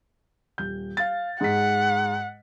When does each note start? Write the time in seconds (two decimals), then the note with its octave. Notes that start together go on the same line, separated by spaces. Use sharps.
0.58 D#1 G6
0.97 F5 A6
1.41 G#2 G#4 F#5 B6